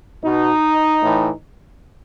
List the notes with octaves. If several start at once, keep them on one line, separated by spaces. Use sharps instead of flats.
B2 D#4
A2 E3